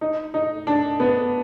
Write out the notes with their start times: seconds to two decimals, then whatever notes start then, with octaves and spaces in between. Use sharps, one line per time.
0.01 D#4
0.34 D#4
0.67 D4
1.00 B3